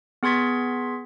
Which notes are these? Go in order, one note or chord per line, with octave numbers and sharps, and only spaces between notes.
B3 G#4 C6 G#6 B6